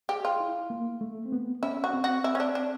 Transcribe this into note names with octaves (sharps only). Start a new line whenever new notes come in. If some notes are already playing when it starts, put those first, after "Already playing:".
G4 G#4
F4
E4
A#3
A3
C4
B3
C#4 E4
C#4 F#4
C4
F#4
E4
C#4
D4
D4